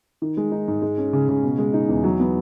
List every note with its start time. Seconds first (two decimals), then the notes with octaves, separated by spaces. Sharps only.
0.22 D#3
0.37 G#3
0.52 D#4
0.68 G#2
0.82 G#3
0.98 C#4
1.13 C#3
1.29 C#3
1.43 B2
1.58 G#3
1.74 D#4
1.89 E2
2.04 F#3
2.20 B3